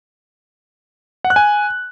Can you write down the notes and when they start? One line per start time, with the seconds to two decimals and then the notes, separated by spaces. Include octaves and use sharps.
1.25 F#5
1.30 F#6
1.36 G#5